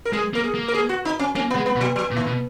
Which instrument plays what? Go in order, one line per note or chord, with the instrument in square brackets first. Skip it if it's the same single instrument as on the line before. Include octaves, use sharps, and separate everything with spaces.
[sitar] A#4
[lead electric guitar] G#3 [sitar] G#4
[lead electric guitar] A#3 [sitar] A#4
[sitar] G#4
[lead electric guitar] A#3
[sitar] A#4
G#4
F#4
D#4
C#4
[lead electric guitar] A#3 [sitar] C#4
[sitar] B3
[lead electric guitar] G#3
[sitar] B3
[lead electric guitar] B2
[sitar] F#3
F#3
[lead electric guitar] A#2
[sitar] D#3
[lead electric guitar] B2